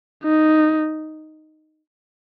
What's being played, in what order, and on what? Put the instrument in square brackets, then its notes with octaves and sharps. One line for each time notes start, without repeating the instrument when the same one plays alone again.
[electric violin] D#4